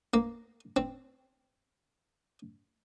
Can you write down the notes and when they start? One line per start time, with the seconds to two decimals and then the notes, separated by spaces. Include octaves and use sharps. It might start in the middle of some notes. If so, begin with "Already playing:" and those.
0.14 A#3
0.76 C4